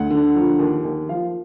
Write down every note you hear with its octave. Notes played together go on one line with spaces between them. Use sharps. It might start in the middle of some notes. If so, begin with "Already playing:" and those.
Already playing: D2 F#5
D3
F3
D#2
D#2
F3 F5